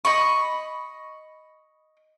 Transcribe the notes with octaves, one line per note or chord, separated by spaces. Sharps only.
D#5 B5 C#6